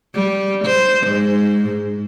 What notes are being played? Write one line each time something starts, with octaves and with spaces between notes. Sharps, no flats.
G3
C5
G#2